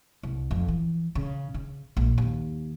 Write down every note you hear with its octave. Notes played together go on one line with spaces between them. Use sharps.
C2
F2
E3
C#3
C#3
A#1
D#2